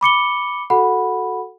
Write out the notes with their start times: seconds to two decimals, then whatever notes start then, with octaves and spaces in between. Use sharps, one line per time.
0.01 B5 D6 C#7 G7
0.70 F#4 A4 F#5 B5